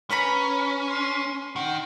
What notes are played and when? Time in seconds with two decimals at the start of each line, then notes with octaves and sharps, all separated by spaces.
0.10 C#4 B4 A#5 B5
0.90 C6
1.56 D#3 F#5